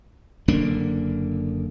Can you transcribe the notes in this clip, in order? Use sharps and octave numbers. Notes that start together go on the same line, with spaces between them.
F#1 D3 A#3 D4